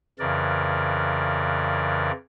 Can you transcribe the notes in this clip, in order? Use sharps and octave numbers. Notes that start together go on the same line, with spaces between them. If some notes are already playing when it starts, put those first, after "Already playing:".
F2 C#3 E3 A#4 D5